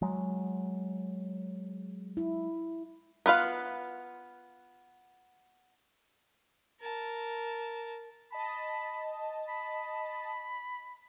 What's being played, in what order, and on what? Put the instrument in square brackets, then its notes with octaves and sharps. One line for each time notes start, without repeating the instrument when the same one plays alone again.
[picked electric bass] F#3 G#3
[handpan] E4
[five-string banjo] B3 F4 B4 F5
[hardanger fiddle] A#4 A5
[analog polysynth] D#5 A5 [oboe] B5
[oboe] B5